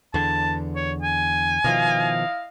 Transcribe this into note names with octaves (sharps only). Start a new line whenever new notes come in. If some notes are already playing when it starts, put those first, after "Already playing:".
E2 D3 A5
C#5
G#5
B2 D#3 F3 E4 D#5 F5